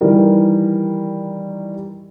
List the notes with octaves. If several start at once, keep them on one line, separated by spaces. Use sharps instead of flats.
D#3 E3 G3 A#4